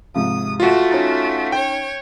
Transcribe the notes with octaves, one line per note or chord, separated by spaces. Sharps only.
G#2 C3 F3 D#6
A3 F4 F#4
C#4 D#4 A6
C#5 G5